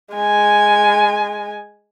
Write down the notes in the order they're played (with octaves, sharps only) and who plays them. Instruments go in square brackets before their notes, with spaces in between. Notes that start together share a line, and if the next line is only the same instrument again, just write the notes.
[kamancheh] G#3 G#5